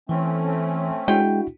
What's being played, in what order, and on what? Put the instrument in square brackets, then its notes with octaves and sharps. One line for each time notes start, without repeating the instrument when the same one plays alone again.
[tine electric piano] E3 [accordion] A3 C4 C#4
[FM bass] G#3 [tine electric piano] D4 E4 F#4 [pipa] G5